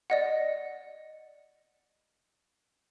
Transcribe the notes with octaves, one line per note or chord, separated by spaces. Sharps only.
D5 D#5 F#5